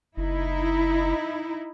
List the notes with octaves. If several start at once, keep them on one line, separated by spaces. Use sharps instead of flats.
F#1 D#4 E4